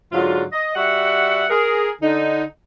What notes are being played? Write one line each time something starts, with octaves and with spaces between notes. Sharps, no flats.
G#2 D3 F#3 F4
D#5
G3 F#4 E5 F#5
G#4 A#4
D3 D#4